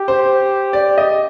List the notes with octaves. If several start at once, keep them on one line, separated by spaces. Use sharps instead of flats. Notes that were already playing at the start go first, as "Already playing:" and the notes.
Already playing: G4
C5
D5
D#5